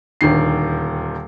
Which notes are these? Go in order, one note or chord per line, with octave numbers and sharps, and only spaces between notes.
D#1 D2 D#3 C7